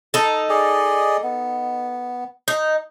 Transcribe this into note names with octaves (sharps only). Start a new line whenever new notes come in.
D#4 A4
G#4 D5 D#5
B3
D#4